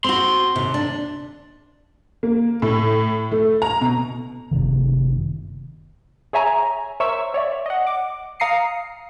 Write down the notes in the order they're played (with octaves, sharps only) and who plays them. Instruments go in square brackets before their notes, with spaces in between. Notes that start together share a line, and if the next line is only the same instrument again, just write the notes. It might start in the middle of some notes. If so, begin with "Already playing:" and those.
[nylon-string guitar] C4 F#4 [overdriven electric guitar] C6
[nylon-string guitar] D#2 C3
D4
[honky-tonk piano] A#3
A2
A3
A#5
B2
[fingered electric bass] F#1 C2 C3 D#3
[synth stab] G#4 C#5 E5 G#5 A#5
A#4 C5 C#5 E5 C#6 E6
C#5 D5 E5
D#5 F#5
D6
F5 A#5 D#6 C7 C#7